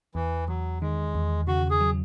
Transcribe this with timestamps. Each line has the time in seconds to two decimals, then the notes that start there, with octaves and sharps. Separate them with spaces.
0.15 E2 E3
0.48 E2 F#3
0.81 D#3 G#3
1.15 E2
1.47 C#3 F#4
1.70 G#4
1.81 F#3